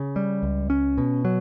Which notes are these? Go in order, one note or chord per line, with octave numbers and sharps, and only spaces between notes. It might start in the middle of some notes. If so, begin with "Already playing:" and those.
Already playing: C#3
G3
C#2
C#4
B2
F#3